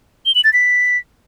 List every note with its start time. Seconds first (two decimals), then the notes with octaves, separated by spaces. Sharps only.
0.26 G7
0.35 F#7
0.44 A6
0.53 B6